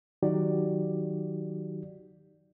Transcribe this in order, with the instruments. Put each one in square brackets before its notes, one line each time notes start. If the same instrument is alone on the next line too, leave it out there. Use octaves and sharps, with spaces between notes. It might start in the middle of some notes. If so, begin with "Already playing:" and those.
[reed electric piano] D#3 F#3 D#4 F#4 G4 D5